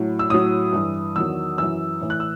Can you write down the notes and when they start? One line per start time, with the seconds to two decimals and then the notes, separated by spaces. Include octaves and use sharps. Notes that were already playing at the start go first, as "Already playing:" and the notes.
Already playing: A2 F#3
0.19 E6
0.30 A2 F#3 D#6
0.73 G2 E3
1.16 E2 D#3 F#3 E6
1.58 F#2 E3 E6
2.01 A2 E3
2.10 F#6
2.20 E6